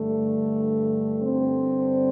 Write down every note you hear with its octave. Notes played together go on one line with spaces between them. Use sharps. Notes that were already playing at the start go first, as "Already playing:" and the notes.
Already playing: G2 D3 A3
G2 D3 C4